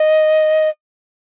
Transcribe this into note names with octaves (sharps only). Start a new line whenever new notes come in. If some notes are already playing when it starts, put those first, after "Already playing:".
Already playing: D#5